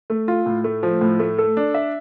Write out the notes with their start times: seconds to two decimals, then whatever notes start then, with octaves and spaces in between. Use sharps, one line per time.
0.10 A3
0.28 F4
0.46 A2
0.64 A3
0.83 F3
1.01 A2
1.19 A3
1.38 A4
1.57 D4
1.74 E5